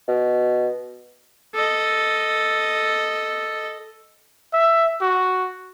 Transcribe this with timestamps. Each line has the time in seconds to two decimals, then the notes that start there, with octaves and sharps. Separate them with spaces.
0.08 B2
1.55 A4 D#5
4.53 E5
5.01 F#4